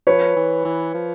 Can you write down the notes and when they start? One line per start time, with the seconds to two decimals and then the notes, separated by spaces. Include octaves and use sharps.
0.07 F3 B4 C#5
0.36 E3
0.65 E3
0.94 F3